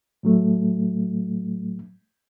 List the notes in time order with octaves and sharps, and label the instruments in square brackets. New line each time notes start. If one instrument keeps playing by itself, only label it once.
[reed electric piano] A2 F#3 A3